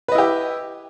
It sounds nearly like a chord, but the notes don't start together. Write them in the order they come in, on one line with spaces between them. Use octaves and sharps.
B4 D#5 E4 G4